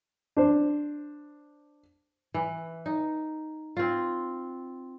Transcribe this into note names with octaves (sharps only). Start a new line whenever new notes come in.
D4 C5
E3
D#4
C4 F4